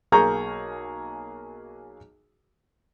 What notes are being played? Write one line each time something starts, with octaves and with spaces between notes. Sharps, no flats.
B1 A#3 G#4 A#5 C#6 G6